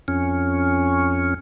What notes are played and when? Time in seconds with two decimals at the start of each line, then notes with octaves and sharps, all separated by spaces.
0.08 F2 C#4